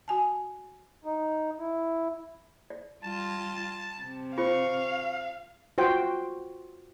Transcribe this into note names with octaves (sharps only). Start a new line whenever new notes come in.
F#4 G#5 A5
D#4
E4
D5
G3 F4 A5
C3
F4 C5 F5 C#6
F4 F#4 C5 G5